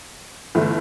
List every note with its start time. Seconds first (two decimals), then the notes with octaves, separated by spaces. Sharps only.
0.55 G1 E3 A3 E4